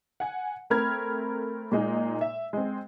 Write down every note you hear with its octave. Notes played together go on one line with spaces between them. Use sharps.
F#5 G#5
A3 C4 A#4 B5 F6 G#6
A#2 G#3 D#4
E5
G#3 C4